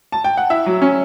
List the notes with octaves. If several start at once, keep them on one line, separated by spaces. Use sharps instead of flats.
A5
G5
F#5
E4 E5
F#3
C#4